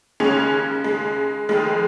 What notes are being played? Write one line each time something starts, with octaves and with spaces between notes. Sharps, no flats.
D#2 C#3 G#3 C#4
G#3
F1 F2 D#3 G#3